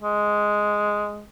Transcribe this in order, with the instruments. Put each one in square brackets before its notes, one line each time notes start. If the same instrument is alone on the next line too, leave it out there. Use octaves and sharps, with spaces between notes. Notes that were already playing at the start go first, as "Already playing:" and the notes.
[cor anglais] G#3